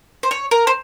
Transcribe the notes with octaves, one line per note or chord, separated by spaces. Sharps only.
C5
C#5
A#4
C5